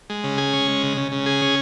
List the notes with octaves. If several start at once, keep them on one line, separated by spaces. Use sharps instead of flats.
G#3
C#3
G#4
C#4
G#3
C#3
C#3
C#3
G#4
C#4